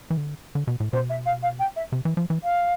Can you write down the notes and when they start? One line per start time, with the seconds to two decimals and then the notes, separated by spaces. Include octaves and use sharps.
0.10 E3
0.17 D3
0.55 D3
0.67 B2
0.80 A2
0.92 B2 C5
1.09 E5
1.25 F5
1.42 F5
1.59 G5
1.76 E5
1.92 C3
2.05 E3
2.17 F3
2.30 E3
2.43 F5